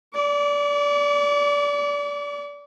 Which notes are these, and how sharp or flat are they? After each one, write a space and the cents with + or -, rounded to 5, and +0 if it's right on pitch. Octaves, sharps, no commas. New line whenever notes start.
D5 -25 C#6 +45